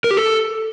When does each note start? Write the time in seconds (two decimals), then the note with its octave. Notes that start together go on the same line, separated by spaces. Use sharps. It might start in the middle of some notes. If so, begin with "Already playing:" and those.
0.04 A#4
0.11 G4
0.17 A4